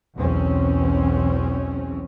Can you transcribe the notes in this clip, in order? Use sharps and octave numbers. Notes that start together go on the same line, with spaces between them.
B1 E2 B2 C4 C#4